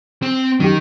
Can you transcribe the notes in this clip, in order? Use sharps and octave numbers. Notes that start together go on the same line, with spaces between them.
C4
F#2 D#3 G4